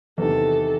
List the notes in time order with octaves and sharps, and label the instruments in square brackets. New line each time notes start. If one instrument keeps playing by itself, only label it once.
[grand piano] E2 C3 D#3 [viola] A4